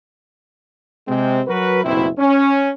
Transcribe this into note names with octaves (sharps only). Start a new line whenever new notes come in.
C3 G#3 C4
F#3 F#4 A#4 B4
F#1 C2 B2 C4 E4
C#4